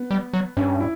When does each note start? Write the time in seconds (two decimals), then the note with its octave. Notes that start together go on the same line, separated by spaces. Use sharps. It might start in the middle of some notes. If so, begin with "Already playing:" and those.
Already playing: B3
0.11 G3
0.33 F#3
0.57 G2 C#4
0.80 E4